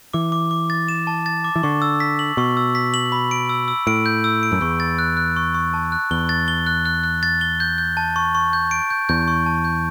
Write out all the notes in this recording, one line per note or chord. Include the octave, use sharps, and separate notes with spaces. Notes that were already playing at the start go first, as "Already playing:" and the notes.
E3 D6
D6
D6
A6
E7
A5
A6
D6
E3
D3 C#6
E6
B6
F#7
B2 C#6
E6
B6
F#7
B5
D7
E6
E6
A2 D7
G6
E6
D7
F#2
E2 C#6
A6
F#6
F#6
C#6
C#6
A5
F#6
E2 G7
A6
G7
F#6
F#6
F#6
A6
G7
G6
G6
A5
C#6
C#6
G6
D7
G6
E2 G6
C#6
A5
G6